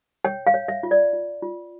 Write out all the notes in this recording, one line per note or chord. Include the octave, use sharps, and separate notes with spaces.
C#5 G5
F5
C#5
E5
F4
D5
F4
F4